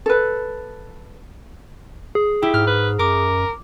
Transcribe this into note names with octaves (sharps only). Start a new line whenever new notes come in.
A4 B4
G#4
E4 G4
G#2 F6
B4
F#2 A#4 D6